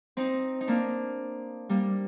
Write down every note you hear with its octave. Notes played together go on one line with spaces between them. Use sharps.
C4 D#4
D#4
A#3 D4
G3 A#3